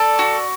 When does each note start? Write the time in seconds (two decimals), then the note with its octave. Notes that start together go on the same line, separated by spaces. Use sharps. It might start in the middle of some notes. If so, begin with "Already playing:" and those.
Already playing: A4 D5
0.19 F#4